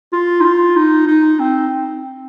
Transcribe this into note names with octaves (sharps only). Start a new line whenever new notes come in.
F4
D#4
F4
D#4
D#4
C4